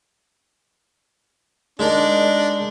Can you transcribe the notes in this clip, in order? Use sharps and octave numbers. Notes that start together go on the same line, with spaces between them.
G#3 D4 D#4 A#4